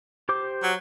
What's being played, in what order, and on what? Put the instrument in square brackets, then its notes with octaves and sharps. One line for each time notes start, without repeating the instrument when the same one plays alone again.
[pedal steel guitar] G4 C5 D6
[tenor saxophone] F#3